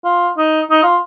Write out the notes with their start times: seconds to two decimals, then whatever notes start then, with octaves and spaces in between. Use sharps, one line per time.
0.05 F4
0.38 D#4
0.71 D#4
0.83 F4